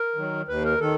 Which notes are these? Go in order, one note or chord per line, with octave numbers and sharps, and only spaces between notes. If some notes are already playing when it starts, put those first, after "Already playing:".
Already playing: A#4
D#3 F#3
D#2 B4
A#4
D#3 A4